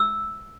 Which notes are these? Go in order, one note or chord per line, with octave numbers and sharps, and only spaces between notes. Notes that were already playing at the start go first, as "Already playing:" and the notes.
Already playing: E6